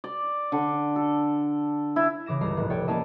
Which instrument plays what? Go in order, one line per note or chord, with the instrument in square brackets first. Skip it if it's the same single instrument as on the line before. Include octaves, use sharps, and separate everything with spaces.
[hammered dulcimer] D5
D3
A4
E4
[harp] C#3 E3 D6 A#6 E7
G1 C#2 G2 A#5 C7
F1 A2 A#3 F#6
A4 C#5 D5 G5
A#3 C#4 E4 D5 D#5 A5